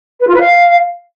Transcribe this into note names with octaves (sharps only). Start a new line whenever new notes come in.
B4
F4
B4
F5